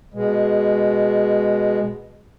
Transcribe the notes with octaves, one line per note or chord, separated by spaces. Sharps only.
B2 G#3